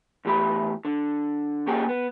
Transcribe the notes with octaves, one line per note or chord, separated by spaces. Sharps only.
E2 A2 G4 B5
D3
A#3 C#4 G4 G#4 F#5 G5
B3